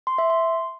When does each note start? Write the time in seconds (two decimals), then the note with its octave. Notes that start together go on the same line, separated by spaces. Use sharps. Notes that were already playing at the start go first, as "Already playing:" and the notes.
0.07 C6
0.18 E5
0.30 C6